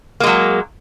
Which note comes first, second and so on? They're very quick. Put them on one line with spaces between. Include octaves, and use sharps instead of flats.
A#3 G#3 F#3